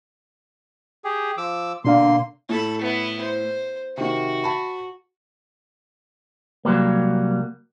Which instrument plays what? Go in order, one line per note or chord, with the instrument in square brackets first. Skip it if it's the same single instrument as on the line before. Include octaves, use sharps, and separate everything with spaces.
[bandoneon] G4 G#4
F3 D6 E6
[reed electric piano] B2 D4 F5 [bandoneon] D3 A#3 C6
[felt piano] A2 [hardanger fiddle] A4 B5
[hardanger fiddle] B3 E4
C5
[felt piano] C3 D#3 [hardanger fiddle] F#4
[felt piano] A5 B5
[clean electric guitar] C2 F#3 G3 A#3